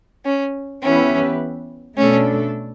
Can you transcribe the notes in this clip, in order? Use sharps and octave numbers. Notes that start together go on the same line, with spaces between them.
C#4
E3 B3 C#4 E4 G4 B4
B2 A3 C#4 D4 A4